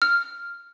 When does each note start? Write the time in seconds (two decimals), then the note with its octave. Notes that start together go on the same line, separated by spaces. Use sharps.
0.02 F6